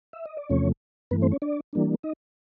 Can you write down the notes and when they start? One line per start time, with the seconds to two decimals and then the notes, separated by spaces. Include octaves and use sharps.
0.13 E5
0.25 D#5
0.37 D5
0.49 E2 C3 F3 A3 C#4 C#5
1.11 G2 E3 A3 B3 B4
1.22 C4 C5
1.32 C#4 C#5
1.42 D4 D5
1.73 E3 G3 A#3 D4
2.03 D#4 D#5